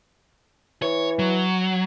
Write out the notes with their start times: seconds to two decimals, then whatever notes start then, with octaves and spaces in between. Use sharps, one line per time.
0.82 E3 C#5
1.19 F#3